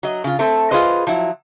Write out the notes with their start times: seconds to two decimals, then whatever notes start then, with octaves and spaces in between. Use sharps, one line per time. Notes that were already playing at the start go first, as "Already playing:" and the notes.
0.03 F#3 D#5
0.24 C#3 F4
0.39 A3 C4 A4
0.71 F4 G#4 B4 C5 D#5
1.07 F3 F#3 E4